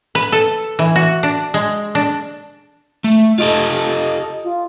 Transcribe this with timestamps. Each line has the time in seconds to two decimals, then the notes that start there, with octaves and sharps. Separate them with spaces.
0.15 B4
0.32 A4
0.79 E3
0.96 F#4
1.23 D4
1.54 G#3
1.95 D4
3.04 A3
3.38 F4 G4 A4 D#5
4.45 F4